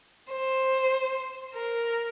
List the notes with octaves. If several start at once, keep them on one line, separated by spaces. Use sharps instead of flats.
C5
A#4